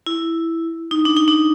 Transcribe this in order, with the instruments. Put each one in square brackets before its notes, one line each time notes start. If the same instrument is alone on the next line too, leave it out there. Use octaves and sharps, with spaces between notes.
[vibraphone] E4
D#4
D4
D#4
D4